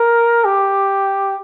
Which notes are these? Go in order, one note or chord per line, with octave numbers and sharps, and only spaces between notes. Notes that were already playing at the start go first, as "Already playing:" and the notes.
Already playing: A#4
G4